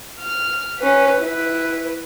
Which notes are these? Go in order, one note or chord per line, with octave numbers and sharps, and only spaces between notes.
F6
C#4 B4
E4 B4